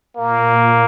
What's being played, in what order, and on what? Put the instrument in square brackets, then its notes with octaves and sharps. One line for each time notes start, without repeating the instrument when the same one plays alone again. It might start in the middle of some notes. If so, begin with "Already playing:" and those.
[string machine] A#2 [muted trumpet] A#3